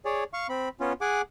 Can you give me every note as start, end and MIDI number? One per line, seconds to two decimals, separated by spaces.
0.05 0.24 68
0.05 0.24 73
0.05 0.24 74
0.33 0.47 77
0.33 0.47 85
0.49 0.69 60
0.49 0.69 83
0.80 0.93 59
0.80 0.93 61
0.80 0.93 65
1.01 1.22 68
1.01 1.22 78
1.01 1.22 80
1.01 1.22 86